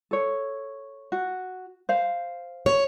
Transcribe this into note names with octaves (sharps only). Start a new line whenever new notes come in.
A4 C#5
F#4
C5 F5
C#5